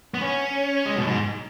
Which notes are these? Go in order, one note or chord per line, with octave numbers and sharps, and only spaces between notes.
B3
C#4
G#3
B2
G#2